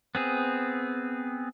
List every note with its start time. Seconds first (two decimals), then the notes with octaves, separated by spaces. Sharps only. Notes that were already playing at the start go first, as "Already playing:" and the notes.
0.15 B3 C4 G#4